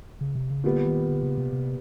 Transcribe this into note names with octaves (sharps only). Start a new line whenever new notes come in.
C#3
C3
C#3
A#2 D3 G3 B3
D#3
D3
C#3
C3
C3